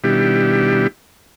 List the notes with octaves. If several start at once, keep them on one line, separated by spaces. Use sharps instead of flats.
B2 D#3 G3 D4 E4 G4